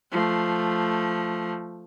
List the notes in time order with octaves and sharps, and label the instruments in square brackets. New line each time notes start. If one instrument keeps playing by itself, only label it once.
[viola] F3 A3